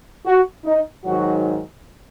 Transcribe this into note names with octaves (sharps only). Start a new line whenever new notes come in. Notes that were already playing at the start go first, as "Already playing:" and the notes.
F#4
D#4
G#2 D#3 F#3 F#4